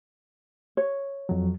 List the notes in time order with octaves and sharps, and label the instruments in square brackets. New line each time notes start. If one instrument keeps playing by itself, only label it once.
[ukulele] C#5
[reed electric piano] F2 F#3